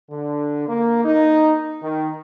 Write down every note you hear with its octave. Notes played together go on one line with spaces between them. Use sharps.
D3
A#3
D#4
D#3